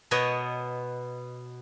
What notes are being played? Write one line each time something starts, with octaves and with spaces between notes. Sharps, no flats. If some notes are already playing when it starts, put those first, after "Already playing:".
B2 B3 C#5 D#5